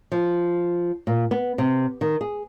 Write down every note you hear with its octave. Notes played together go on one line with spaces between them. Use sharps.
F3
A#2
B3
C3
D#3
G#4